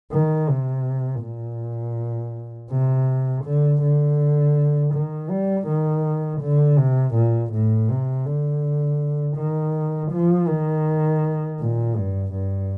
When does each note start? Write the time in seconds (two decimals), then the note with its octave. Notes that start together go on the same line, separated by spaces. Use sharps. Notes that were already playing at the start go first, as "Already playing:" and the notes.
0.12 D#3
0.49 C3
1.23 A#2
2.71 C3
3.45 D3
3.83 D3
4.94 D#3
5.30 G3
5.67 D#3
6.41 D3
6.78 C3
7.15 A#2
7.53 A2
7.89 C3
8.26 D3
9.37 D#3
10.12 F3
10.48 D#3
11.60 A#2
11.96 G2
12.33 G2